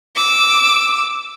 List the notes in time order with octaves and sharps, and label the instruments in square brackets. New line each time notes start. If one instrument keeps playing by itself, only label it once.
[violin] D6 E6